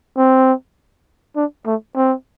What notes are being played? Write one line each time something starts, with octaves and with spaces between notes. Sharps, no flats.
C4
D4
A3
C4